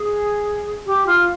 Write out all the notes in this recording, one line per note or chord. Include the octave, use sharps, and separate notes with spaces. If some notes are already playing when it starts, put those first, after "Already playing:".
Already playing: G#4
G4
F4